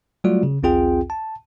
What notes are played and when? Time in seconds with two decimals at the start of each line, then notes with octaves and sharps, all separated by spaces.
0.24 F#3 G3 A3 F4 F#4 D5
0.43 C#3
0.63 B1 E2 C4 F4 G#4 G5
1.10 A5